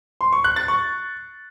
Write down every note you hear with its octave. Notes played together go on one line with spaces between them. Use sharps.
C6
C#6
F#6
A6
C#6